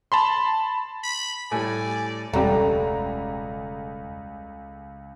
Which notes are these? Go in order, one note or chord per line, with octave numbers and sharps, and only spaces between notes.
A5 B5 C6
B5
A2 G3 D5 G#5
E1 C#2 G3 A3 F#5 A#5